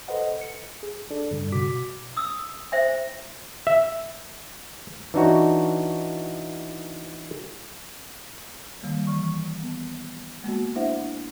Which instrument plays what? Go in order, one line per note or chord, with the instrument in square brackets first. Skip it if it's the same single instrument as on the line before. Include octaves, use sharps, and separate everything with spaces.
[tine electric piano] A4 B4 C5 D#5 F#5
C#7
G#4
D4 A4 D5
G2 C#3 G3
B2 F#4 D6 B6
[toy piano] D#6 E6
C5 E5 G5
[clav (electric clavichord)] E5
E3 D4 D#4 F#4 C#5
[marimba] D#3 G3 A#3
E3 C#6
B3
G#3 A#3 B3 F#4
D4 E4 C5 E5 F#5